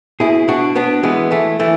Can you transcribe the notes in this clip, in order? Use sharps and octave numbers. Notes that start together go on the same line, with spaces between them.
B2 E4 G#4
B2 D4 F#4
B2 B3 D4
E3 G#3 B3
E3 A3
E3 A3